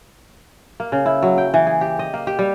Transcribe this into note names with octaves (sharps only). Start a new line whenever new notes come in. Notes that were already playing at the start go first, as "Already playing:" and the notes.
A#3
C#3
E4
F#3
G5
E3
G#4
G4
D#5
A#3
G4
G3